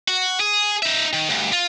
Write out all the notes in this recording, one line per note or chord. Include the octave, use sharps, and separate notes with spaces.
F#4
G#4
D#4 E5
D#3
D2 G2
F4